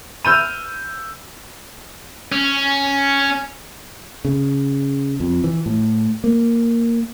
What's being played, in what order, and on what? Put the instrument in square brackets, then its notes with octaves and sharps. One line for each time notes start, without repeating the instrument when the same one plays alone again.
[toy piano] B4 B5 [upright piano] E6 G6 D#7
[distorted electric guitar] C#4
[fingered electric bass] C#3
F2
E3
A2
A#3